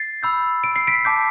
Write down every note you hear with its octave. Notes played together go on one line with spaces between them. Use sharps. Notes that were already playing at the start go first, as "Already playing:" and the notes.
Already playing: A6 C7
B5 E6 G6
D7
C7
B6 D7
A5 D6 G6